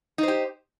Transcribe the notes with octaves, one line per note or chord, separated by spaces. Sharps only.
D#4 G4 C5